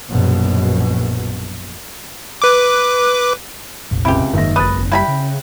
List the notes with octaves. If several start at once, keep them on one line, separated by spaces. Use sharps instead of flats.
A#1 F#2 B2
B4 D6
F1 A#1
C#2 C3 E4 G4
F#1 G#2 D#3 A#3 E5 A#6
G#1 B4 D#6 F#6 A6
G3 E4 G5 A#5 B5
C#3